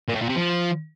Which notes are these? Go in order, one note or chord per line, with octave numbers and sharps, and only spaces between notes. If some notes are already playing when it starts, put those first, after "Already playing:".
A#2
A2
A#2
C3
F3